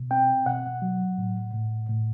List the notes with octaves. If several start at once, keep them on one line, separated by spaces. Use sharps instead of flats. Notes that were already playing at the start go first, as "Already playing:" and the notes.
Already playing: B2
C4 G5
B2 F#5
F#3
A2
A2
A2